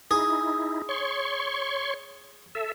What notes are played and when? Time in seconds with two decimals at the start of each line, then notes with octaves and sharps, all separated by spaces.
0.11 D#4 E4 G#4
0.89 C#5 C6 C#6
2.55 A4 E5